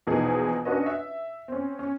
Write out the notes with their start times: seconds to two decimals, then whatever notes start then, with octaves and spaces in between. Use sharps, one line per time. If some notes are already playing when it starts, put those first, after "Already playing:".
0.07 A#1 E2 B2 D#4 G#4
0.65 C#4 D4 F#4 B4 C#5 D#5
0.86 E5
1.48 C4 C#4
1.79 C#4